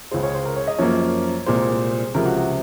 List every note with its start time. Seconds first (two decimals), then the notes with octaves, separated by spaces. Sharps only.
0.11 C#2 C#3 G#3 C5
0.23 C#5
0.35 C5
0.45 A#4
0.56 C#5
0.67 D#5
0.79 F#2 F3 A#3 C#5
1.46 C2 A#2 G#3 C5
2.14 C#2 C3 F3 G#3 A#4
2.25 F#4
2.37 F#4